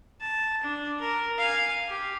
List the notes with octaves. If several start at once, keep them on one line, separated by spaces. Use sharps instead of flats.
A5
D4
A#4
F5 G#5
G4